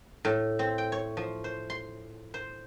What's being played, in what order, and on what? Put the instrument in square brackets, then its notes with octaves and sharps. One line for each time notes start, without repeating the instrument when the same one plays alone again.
[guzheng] A2
C4
G5
C#5
F3
C5
C6
C5